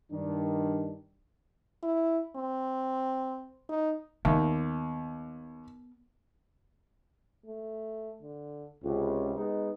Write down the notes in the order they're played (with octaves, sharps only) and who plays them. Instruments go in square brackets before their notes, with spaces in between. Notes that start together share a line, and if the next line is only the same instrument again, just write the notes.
[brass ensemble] G2 D#3 D4
[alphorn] E4
C4
D#4
[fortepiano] D#2 [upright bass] B3
[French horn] A3
D3
[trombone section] C#2 [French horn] C3
[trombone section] G#3 B3 D#4